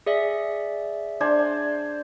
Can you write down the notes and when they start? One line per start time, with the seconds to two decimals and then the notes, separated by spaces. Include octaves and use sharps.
0.06 G#4 D5 E5
1.20 D4 C5 G#5